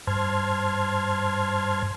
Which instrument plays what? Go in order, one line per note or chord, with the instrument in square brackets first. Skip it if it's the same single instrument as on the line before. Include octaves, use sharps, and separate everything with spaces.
[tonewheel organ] G2 C5 A5 C6 F6 G#6